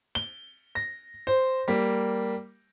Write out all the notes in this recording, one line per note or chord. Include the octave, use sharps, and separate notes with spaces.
G7
A#6
C5
G3 A#3